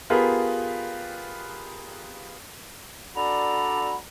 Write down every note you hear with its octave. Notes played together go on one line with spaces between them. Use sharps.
B3 F4 G4 G#4 A#4 B4
D4 F#4 A4 D5 A#5 B5